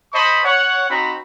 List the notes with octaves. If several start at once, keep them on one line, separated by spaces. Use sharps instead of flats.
C5 D#5 A5 B5 C#6
C#5 F#5
C4 D#4 F#4 A#5 B5